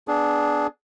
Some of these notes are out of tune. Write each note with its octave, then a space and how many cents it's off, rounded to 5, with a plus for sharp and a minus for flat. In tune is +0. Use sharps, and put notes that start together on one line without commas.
B3 +0 D4 +0 G#4 +15